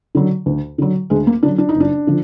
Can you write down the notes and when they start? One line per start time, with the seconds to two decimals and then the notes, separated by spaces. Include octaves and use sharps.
0.15 D3 F#3
0.46 D2
0.78 D3 F#3
1.10 D2 G#3
1.27 A#3
1.43 D3 F#3 D4
1.58 D4
1.69 D#4
1.75 F#1
1.80 D4
2.07 D3 F3